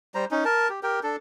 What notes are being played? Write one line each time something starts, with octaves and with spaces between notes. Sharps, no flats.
G3 C5 A#5
C#4 D#4
A#4 A5
G4
G4 A#4 G5
D4 A4